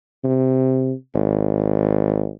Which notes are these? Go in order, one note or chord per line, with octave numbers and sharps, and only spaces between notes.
C3
G#1